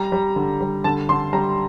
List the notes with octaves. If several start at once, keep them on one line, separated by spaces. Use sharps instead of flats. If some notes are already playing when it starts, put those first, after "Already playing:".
Already playing: G3 A#5
G3
D3
G3
D3 A5
D3 C6
G3 A#5